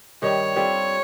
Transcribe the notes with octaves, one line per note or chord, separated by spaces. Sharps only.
G2 D#3 G3 C#5
G3 C4 F4 A4